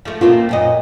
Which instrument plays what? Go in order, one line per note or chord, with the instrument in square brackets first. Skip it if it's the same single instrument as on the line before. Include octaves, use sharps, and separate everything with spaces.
[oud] F3 A3
[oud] B2 A3 A#3 [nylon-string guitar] C4 F4
[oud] F#2 A#2 D#5